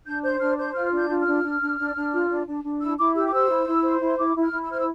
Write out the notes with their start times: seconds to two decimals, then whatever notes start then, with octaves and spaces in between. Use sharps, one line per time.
0.06 D4 G6
0.23 C5 G6
0.40 D4 F6
0.58 C5 G6
0.75 F4 F6
0.92 D4
0.98 G6
1.10 F4
1.21 F6
1.27 D4
1.43 D4
1.61 D4
1.79 D4
1.96 D4
2.12 F4
2.30 D4
2.47 D4
2.64 D4
2.81 E4 E6
2.98 E4 D6
3.15 G4 E6
3.26 D6
3.33 C5 E6
3.50 E4
3.67 E4
3.84 C5
4.01 E4
4.07 C6
4.18 E4 D6
4.36 E4
4.42 F6
4.52 E4
4.64 E6
4.70 C5 F6
4.78 E6